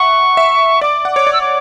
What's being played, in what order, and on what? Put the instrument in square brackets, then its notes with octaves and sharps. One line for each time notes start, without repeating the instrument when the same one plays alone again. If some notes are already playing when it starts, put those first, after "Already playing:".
Already playing: [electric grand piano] E5 F#5 [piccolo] C#6
[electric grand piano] E5
[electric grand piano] D5 [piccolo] D6
[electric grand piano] F#5
[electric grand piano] C#5 [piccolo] D6
[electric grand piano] D5
[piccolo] E6
D6